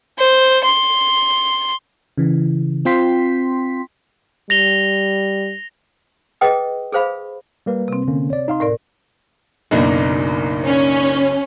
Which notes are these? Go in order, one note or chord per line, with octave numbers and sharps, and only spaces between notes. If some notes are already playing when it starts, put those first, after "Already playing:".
C5
C6
C#3 E3
C4 F4 G5 C6 B6
G3 A#6 F7 G7
G#4 B4 D#5 G5 D#6
G#4 A4 C5 F5 B5
G3 A#3 B4
C3 C4
D3 A#3 C#4
C#5 D5
D#4 F5 C6
A2 A#4 D5
F#1 B1 F#2 A#3 D4 D#4
C#4